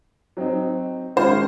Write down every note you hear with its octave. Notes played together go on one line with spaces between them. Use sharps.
F#3 C4 D#4
D#3 G#3 C#4 F4 C5